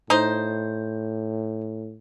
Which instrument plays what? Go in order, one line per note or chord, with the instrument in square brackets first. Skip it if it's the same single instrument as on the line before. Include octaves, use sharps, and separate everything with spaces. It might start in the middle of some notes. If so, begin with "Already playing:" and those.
[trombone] A2 [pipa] D#4 C5